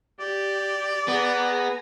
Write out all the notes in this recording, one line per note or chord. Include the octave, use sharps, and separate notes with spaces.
G4 D5
B3 G#4 G#5 A#5